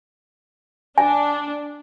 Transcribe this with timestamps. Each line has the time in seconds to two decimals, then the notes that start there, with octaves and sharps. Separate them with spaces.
0.98 D4 G#5